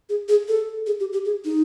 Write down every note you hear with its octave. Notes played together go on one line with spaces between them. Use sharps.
G#4
G#4
A4
G#4
G4
G4
G#4
D#4